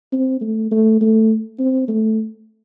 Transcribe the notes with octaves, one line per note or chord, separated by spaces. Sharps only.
C4
A3
A3
A3
C4
A3